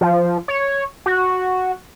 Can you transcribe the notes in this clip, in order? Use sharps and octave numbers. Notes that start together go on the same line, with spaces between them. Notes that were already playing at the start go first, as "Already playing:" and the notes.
F3
C#5
F#4